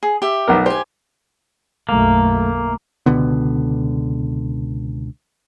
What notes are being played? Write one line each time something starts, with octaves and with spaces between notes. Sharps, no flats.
G#4
G4 E5
B1 B3 A#4
G4 C5 G#5
B1 F#2 A3 A#3
C#2 B2 D3 B3